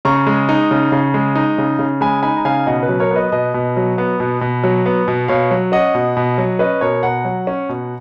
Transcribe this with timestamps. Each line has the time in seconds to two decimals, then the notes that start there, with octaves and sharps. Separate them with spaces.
0.05 C#3 A#5 C#6
0.27 G#3
0.49 D#4
0.71 C#3
0.92 C#3
1.14 G#3
1.35 D#4
1.58 C#3
1.79 C#3
2.01 G#3 G#5 B5
2.23 D#4 G#5 B5
2.37 A#5
2.45 C#3 F5 G#5
2.66 B2 D#5 F#5
2.83 B4
2.89 F#3
3.00 A#4 C#5
3.11 B3 B4 D#5
3.32 B2 B4 D#5
3.54 B2
3.77 F#3
3.98 B3
4.20 B2
4.41 B2
4.64 F#3
4.86 B3
5.08 B2
5.28 B2 C#5 F5
5.51 F#3
5.72 C#4 D#5 F#5
5.95 B2
6.17 B2
6.38 F#3
6.59 C#4 B4 D#5
6.81 B2 A#4 C#5
7.03 B2 F#5 A#5
7.25 F#3
7.47 C#4
7.69 B2